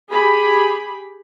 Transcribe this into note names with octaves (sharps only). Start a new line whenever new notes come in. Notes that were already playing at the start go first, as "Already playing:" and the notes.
G4 G#4 B5